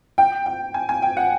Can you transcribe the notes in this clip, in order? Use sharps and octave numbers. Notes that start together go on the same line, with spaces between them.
G5
G5
G#5
G#5
G5
F#5